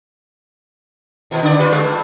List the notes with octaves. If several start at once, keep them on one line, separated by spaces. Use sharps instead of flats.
D#2 B2
C#3 D5
F4 G4 B4
G3
G2